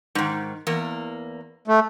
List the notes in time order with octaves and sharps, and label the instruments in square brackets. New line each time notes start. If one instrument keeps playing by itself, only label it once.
[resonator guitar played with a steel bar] G#2 D#3
E2 A#3
[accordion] A3